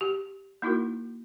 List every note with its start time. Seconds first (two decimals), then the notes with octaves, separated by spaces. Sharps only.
0.01 G4
0.62 A#3 D#4 E4 F#4 A#4